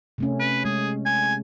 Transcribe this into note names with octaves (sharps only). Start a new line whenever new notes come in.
C3 A3 C#4
B4
G#3 G#4
G#5